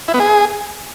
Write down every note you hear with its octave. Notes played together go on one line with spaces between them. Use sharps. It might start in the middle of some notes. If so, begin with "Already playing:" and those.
E4
B3
G#4